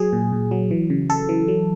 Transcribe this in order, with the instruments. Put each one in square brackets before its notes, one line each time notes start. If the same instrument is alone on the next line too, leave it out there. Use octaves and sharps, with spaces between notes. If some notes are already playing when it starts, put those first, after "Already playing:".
Already playing: [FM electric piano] F#3 G#4
A#2
A#2
F#3
E3
C#3
C#3 A4
E3
F#3